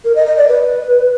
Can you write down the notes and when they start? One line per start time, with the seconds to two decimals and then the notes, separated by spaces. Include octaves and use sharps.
0.05 A#4
0.16 D#5
0.26 D#5
0.37 D5
0.48 B4